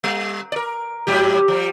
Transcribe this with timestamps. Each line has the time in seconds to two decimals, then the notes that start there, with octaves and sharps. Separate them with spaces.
0.04 G3
0.52 A#4 D5
1.07 G#2 F#3 G4
1.48 F3 G3